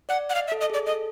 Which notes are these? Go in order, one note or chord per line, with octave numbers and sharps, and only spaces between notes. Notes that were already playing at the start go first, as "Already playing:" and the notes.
D5 F#5
F#5
D#5 F5
E5
A4
D#5
G#4 D5
A4 D#5